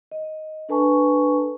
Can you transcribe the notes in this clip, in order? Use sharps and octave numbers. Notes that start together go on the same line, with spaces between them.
D#5
D4 A4 B4 G#5 A5 C#6